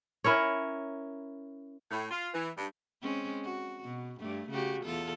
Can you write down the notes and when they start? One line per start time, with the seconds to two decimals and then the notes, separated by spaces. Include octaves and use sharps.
0.24 C#4 E4 A#4 C#5
1.90 A2
2.10 F4
2.33 E3
2.57 G2
3.02 G#3 C4 C#4
3.44 F#4
3.84 B2
4.19 G2 A3
4.50 C#3 F#4 G4
4.85 E2 F4 A4